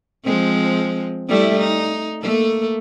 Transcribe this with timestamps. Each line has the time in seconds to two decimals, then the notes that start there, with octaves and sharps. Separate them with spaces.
0.25 F3 G#3 C4
1.28 G3 A3 E4
1.59 D#4
2.22 A3 A#3 A4